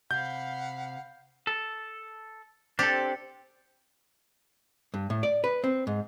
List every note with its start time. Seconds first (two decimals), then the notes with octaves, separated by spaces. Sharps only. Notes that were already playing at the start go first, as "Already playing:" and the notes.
0.11 C3 F5 F#5 B5 G6
1.47 A4
2.79 C4 D4 G4 A4
4.94 G2
5.10 A2
5.23 D5
5.44 B4
5.64 C4
5.87 G#2